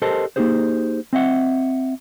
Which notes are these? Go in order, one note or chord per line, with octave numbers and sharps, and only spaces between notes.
G4 A4 A#4 C5 D#5 A5
A#3 B3 D#4 G4 G#4 C5
C4 D#5 E5 F#5